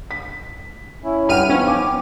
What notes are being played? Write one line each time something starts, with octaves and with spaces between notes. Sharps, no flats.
B6
C#4 E4
G2 F#5 G5 B5 F6 D#7
F3 B3 C#4 D#4
G5 D6